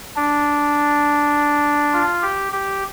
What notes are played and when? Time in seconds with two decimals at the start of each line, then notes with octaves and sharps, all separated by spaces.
0.16 D4
1.93 F4
2.23 G4
2.53 G4